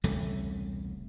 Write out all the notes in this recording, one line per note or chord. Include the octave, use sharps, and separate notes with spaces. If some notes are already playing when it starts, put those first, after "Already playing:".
E1 C2 C#3 A3